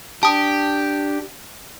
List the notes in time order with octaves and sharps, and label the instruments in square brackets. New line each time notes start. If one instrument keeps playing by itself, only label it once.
[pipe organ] D4 [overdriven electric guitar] G4 [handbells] A5 D#6